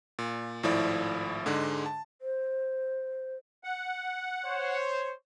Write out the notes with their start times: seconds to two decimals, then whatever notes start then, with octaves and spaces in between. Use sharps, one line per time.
0.19 A#2
0.63 G#1 A2 F3 E4 D5
1.46 G#2 D3 G#3
1.86 A5
2.22 C5
3.64 F#5
4.45 C5 C#5